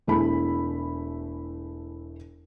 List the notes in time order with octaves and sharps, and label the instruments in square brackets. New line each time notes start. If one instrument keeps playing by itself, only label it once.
[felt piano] E1 A3 E4 G#4 B5